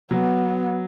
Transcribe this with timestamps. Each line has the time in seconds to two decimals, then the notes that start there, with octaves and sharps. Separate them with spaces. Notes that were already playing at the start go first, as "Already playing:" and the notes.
0.11 F#3 B3